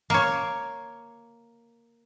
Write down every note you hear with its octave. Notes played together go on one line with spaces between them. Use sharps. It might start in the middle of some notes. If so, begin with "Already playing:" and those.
A#3 C#5